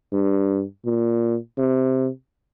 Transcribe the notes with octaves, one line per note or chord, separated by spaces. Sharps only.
G2
A#2
C3